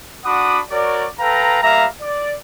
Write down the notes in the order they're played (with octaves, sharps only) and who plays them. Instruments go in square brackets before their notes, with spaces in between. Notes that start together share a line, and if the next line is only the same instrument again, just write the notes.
[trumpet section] D4 F#4 F#5 B5 D6 D#6
F#4 A#4 C#5 D5
A4 B4 F5 G5 A#5
G3 A#3 E5 F5 A#5
D5